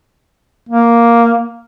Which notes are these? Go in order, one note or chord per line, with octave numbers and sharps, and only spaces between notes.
A#3